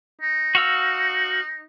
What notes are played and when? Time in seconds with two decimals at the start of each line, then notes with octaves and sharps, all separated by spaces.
0.21 D#4
0.55 F#4 F5 E6